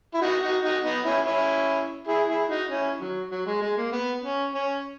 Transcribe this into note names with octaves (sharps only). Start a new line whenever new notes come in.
E4
D#4 F#4
D#4 F#4
D#4 F#4
B3 D#4
C#4 E4
C#4 E4
E4 G#4
E4 G#4
D#4 F#4
C#4 E4
D#3 F#3
F#3
G#3
G#3
A#3
B3
C#4
C#4